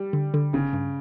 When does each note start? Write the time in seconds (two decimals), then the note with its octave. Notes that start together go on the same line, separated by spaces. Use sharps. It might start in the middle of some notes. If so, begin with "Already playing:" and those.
Already playing: G3
0.13 D3
0.34 D3
0.53 G1 C#3
0.73 G2